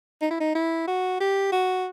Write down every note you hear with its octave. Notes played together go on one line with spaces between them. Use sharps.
D#4
E4
D#4
E4
F#4
G4
F#4